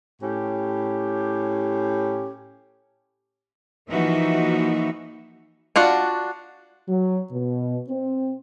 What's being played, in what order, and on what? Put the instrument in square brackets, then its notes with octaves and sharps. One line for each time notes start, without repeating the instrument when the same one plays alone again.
[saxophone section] A2 C#4 G4
[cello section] E3 F3 A#3 D#4 F#4 E5
[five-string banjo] D4 F4 F#4 F#5
[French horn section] F#3
B2
C4